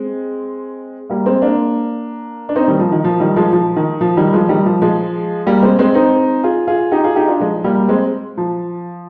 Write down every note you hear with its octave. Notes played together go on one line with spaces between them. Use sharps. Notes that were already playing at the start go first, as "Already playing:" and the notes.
Already playing: G#3 C4
G3 A#3
G#3 C4
A#3 D4
D4
C4 D#4
D#3 G3
F3
D#3
F3
D#3 G3
F3 G#3
F3
D#3
F3
D#3 G3
F3 G#3
D#3 G3
F3
F3 G#3
G3 A#3
G#3 C4
G#3 C4
C4 D#4
F4 G#4
F4 G#4
D#4 G4
F4 G#4
D#4 G4
D4 F4
F3 G#3
G3 A#3
G#3 C4
F3